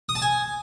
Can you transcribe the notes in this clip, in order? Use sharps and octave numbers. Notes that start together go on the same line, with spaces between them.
D#6
A5
G#5